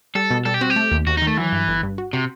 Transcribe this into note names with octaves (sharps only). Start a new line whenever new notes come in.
G3 A4
B2
G3 A4
G4
C4 F#4
G4
A3
D#2
D#2 F#4
D#4
D#3
A3
E3 F#3
G2
G1
G2
F#4
C3 F#4